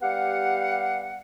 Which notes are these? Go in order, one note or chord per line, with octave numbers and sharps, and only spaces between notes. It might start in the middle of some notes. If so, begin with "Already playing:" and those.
G3 B3 G4 F5 F#5